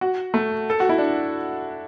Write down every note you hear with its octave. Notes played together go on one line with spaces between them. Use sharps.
F#4
A3
A4
F#4
E4
D4